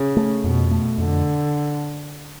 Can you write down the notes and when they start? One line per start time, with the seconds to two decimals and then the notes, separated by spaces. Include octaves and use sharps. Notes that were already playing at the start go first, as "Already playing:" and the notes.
Already playing: C#3
0.17 A3
0.44 F2 B2
0.71 A3
0.98 F2 D3